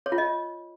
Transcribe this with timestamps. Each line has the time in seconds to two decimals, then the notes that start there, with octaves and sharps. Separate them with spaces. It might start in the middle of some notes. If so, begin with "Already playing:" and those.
0.06 C#5
0.12 F4
0.18 D#5